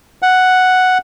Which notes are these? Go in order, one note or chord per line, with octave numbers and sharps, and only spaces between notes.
F#5